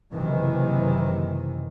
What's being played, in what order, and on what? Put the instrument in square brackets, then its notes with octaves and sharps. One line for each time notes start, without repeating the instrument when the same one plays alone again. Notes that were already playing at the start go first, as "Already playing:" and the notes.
[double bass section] F#1 C3 D#3 E3